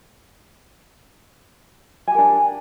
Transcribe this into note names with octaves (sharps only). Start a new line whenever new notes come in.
D4 G4 A#4 G#5